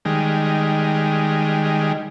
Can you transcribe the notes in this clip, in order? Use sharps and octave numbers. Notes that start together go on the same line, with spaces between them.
D#3 G3 G#3